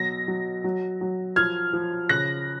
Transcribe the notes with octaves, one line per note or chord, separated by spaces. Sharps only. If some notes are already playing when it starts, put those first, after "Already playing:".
Already playing: B2 F#3 A#6
F#3
F#3
F#3
F3 F6 G#6
F3
C#3 F#6 A#6